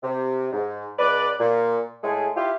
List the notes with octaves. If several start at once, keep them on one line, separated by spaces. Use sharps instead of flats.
C3
G#2
C#2 B4 D5
A#2
A2 G#3 A3 G#4
E4 F4 G4